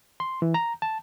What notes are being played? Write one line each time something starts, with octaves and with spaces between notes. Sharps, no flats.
C6
E3
A#5
A5